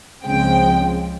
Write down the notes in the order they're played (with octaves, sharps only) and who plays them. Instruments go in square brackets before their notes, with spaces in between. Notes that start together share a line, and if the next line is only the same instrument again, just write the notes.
[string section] C#2 C#3 F3 G#3 C4 G5